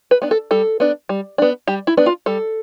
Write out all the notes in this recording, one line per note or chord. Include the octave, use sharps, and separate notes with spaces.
B4
B3 D4
A4
G3 A4
B3 D4
G3
B3 D4
G3 G4
E4
B3 D4
F4
G3 A4